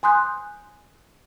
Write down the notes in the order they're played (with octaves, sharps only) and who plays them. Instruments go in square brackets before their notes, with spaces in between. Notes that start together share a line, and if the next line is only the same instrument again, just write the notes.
[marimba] G#5 C6 D#6 F#6 G6